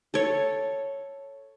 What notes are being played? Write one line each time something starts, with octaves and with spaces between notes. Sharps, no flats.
A4 C#5